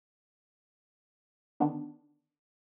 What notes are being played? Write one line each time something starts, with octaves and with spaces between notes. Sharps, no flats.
D3 D#3 B3 D4